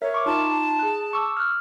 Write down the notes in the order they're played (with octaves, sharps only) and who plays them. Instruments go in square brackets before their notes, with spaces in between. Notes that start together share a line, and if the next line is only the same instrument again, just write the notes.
[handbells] A#4 E5 [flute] C#5
[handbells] C#6 D6
[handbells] D#4 F4 [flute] A5
[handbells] G#4 F#6
C#6 D6 E6
F6 F#6